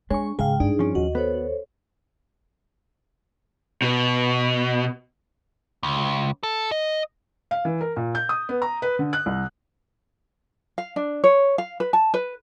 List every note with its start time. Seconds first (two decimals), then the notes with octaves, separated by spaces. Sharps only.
0.10 G#3 D4 C#5 G#5 C#6
0.39 G#2 C#3 G#4 F5 G5
0.60 G2 D4 D#4 G#4
0.79 F3 C#4
0.95 D#2 F#4 D#5
1.15 B3 A4 C5 C#5
3.82 B2
5.83 C#2
6.43 A4
6.71 D#5
7.51 F5
7.65 E3
7.81 A#4
7.96 A#2
8.15 G6
8.29 D#6
8.49 B3
8.62 A#5
8.82 B4
8.99 D3
9.13 F#6
9.26 C2
10.78 F5
10.96 D4
11.24 C#5
11.58 F5
11.80 B4
11.93 A5
12.14 B4